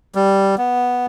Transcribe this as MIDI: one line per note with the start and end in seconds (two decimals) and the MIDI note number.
0.15 0.55 55
0.58 1.06 59